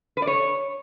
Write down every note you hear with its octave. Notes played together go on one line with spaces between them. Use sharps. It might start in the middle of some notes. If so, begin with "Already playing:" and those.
B4
D5
C#5